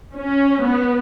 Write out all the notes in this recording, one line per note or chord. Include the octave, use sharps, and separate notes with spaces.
C#4
B3